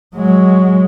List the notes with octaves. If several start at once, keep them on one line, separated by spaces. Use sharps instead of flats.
F#3 G#3